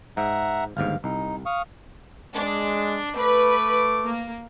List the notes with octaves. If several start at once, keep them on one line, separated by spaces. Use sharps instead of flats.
G#2 E5 F#5 A#5
G1 D#2 G#2 F5 F6
C2 D#4
F5 C#6 D#6
G#3 D4
A3 B4 D6
A#3